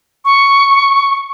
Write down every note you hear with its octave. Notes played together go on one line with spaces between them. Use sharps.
C#6